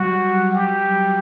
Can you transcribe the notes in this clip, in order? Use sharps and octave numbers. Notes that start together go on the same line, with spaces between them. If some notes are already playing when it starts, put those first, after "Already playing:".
Already playing: F#3 G3 F#4
G4